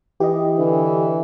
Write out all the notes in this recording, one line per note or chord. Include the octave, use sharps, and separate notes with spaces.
E3 G4 D#5
D3 E3